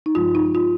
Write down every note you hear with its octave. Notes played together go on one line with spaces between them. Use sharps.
D#4
G2 F3 G#3 F4
D#4
F4